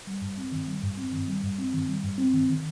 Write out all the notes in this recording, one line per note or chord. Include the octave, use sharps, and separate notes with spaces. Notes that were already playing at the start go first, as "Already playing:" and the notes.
G3
G2
C4
D#3
G3
G2
C4
D#3
G3
G2
C4
D#3
G3
G2
C4
D#3
D#3